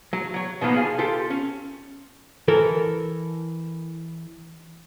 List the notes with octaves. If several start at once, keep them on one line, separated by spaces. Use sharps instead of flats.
F#3
F#3 C#5
B2 D#3 F3 G#3 A#3 B3
G#4 F5 A5
F4 G4 A4
C#4
E3 A4 A#4